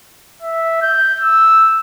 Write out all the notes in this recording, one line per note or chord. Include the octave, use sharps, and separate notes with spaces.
E5
G6
E6